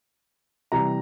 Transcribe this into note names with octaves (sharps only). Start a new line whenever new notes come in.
C3 E3 G3 A#5